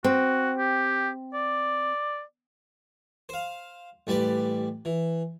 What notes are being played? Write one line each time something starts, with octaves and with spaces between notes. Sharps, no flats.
C4 F#4
G4
D5
C5 F5
A1 G3 B4 D5
E3